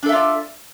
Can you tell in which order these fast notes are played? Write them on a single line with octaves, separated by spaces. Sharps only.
D4 A4 E5 F4 D5